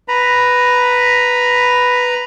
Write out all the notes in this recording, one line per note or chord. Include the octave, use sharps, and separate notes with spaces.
B4 A#5 B5